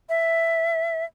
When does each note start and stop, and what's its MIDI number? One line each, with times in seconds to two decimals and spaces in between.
0.09 1.05 76